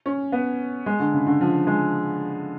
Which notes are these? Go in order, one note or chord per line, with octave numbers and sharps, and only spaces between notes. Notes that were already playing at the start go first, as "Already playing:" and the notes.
C#4
B3
G#3
D3
C#3
D3
F3
G#3